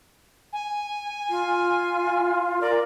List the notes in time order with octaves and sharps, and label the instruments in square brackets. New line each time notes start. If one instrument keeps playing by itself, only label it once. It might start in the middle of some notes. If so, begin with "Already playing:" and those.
[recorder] G#5
[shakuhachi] F4
[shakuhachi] A#4 [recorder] D5